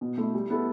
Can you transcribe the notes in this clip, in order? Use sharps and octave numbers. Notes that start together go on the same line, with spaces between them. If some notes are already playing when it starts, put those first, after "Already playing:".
B2
A3 E4
G3
B3 E4 A4